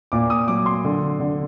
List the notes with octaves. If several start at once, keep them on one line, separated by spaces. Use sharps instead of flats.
A#2 D6
D#6
F#3 D6
C6
D3
D3